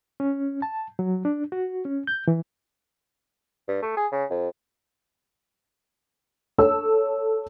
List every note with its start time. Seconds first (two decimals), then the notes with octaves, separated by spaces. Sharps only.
0.20 C#4
0.62 A5
0.99 F#3
1.25 D4
1.52 F#4
1.85 C#4
2.07 G6
2.28 E3
3.68 G2
3.83 A3
3.97 G#4
4.12 C#3
4.30 F2
6.58 A4 C#5 E6